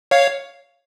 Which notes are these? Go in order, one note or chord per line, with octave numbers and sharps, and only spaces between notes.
C#5 F5